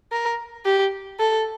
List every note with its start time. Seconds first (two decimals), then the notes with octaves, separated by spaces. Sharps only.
0.12 A#4
0.65 G4
1.19 A4